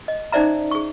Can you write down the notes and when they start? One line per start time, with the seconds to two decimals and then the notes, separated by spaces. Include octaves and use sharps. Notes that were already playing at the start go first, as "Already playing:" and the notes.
0.08 D#5
0.32 C#4 D#4 C5 D5 E5 A#5
0.71 G#4 C#6